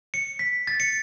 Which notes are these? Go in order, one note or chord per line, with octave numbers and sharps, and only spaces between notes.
C#7
B6
A6
C#7